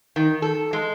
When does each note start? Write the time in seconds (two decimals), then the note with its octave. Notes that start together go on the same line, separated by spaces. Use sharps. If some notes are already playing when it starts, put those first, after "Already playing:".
0.16 D#3
0.42 A4
0.73 G#3